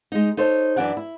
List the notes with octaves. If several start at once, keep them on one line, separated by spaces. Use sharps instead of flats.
G#3 D#4
D#4 A4 C5 C#5
F#2 E3 D4 D5 F#5 G#5
E4